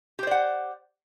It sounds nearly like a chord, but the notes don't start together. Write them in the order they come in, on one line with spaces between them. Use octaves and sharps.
G4 C5 D5 F#5